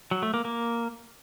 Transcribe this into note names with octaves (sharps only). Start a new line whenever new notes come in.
F#3
A3
A#3
A#3